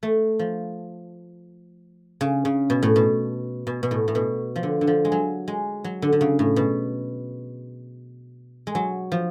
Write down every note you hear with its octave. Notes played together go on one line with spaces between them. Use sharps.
A3
F3
C#3
C#3
B2
A2
B2
B2
B2
A2
A2
B2
F3
D3
D3
F3
G#3
F#3
G#3
F#3
D3
D3
C#3
A2
B2
G#3
F#3
F3